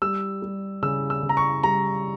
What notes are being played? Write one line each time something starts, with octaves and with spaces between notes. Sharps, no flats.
G3 E6
G3
C#3 E6
E6
C#3
A#5
C#6
G3 A#5